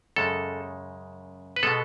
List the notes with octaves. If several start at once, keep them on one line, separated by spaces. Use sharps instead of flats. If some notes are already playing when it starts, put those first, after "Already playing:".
F#2 C#3 G#3 A4
B4
B2 G#3 B3 A4